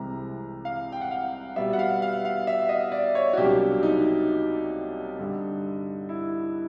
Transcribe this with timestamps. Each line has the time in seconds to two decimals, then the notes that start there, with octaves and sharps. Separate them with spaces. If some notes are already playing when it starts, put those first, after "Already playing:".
Already playing: C2 C3 E3 G#3 A#5
0.65 F5
0.92 G5
1.01 F#5
1.11 F5
1.56 B2 G3 B3 E5
1.73 F#5
1.79 F5
2.02 F5
2.25 F5
2.47 E5
2.69 D#5
2.92 D5
3.15 C#5
3.33 F#4
3.37 C2 B2 F#3 A#3 D4 G4
3.83 D#4
5.19 G2 D3 G3
6.09 E4